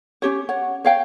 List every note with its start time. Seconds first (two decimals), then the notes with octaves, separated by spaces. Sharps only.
0.22 C#4 G4 C#5
0.49 C#5 F#5
0.84 C#5 F5 G5